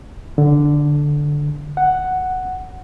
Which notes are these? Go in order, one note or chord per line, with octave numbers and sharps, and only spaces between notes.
D3
F#5